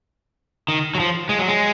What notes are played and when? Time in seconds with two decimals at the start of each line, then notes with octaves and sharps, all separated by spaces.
0.69 D#3
0.95 F#3
1.00 F3
1.29 G#3
1.39 F#3
1.48 G#3